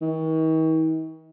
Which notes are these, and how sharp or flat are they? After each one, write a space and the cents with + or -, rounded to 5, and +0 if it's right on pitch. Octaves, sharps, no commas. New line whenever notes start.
D#3 +45